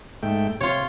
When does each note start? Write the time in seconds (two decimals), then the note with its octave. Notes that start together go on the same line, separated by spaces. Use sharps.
0.23 G#2 A3 G5
0.61 C3 F4 C#5